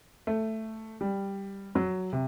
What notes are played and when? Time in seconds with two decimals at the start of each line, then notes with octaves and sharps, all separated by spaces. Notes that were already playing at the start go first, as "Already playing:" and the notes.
0.27 A3
1.01 G3
1.75 F#3
2.13 C3